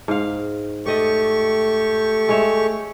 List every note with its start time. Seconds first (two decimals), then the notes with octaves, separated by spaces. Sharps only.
0.08 G#2 F5
0.86 A3 G4 D5 D#5 C#6
2.29 G#3 C#5 E5